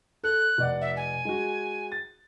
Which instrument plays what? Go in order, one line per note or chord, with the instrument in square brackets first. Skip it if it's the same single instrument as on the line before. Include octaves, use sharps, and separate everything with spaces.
[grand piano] A4 [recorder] F#6
[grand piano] F1 D5 F#5
[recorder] E5
G#5
[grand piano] G#3 F#4
A6